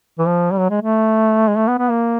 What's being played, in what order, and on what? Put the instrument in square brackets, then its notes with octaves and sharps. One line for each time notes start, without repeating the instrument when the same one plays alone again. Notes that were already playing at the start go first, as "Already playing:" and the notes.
[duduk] E3
F3
G3
F#3
G#3
A3
G#3
A3
B3
B3
A#3